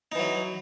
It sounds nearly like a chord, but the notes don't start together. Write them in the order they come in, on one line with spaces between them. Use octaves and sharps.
D#4 E3 F#3